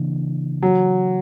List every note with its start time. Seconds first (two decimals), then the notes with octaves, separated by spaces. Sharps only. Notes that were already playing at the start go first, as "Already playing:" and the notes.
Already playing: C#3 E3 A#3 D4
0.62 F#3